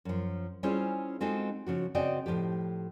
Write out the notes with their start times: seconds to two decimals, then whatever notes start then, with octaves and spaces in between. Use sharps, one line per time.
0.05 F#2 F3
0.63 G3 C#4 E4 F4 G#4 C5
1.21 G#3 C4 D#4 F4 F#4 A4
1.67 C#3 F3 F#4
1.95 C#3 C4 F#4 D5 D#5 G5
2.26 A2 F3 F#3 G4